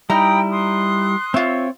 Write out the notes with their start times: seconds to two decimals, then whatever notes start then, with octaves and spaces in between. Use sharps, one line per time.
0.10 G3 D#4 E4 G5 A#5 B5 D#6
0.52 C6 D#6 F#6
1.34 C4 F4 C#5 E5